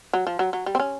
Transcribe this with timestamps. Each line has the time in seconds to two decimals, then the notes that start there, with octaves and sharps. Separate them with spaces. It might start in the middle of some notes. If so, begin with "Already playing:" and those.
0.13 F#3
0.27 F3
0.39 F#3
0.53 F#3
0.66 G3
0.75 C4
0.80 C#4